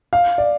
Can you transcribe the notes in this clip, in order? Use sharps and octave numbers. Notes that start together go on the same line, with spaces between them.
F5
D5